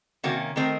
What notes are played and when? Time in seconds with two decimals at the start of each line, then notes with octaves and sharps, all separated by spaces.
0.24 C3 D#3 A#3 C#4 F#4
0.56 D#3 A3 C4 D#4 A#4